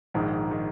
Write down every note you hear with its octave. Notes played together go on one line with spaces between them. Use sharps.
A#1 G#2 D#3
D#3